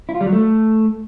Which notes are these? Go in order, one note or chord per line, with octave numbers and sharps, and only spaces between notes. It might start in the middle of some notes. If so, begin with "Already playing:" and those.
E4
F4
G3
F#3
A3